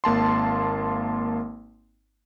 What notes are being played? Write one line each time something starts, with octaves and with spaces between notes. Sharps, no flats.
G#1 A#3 A5 C6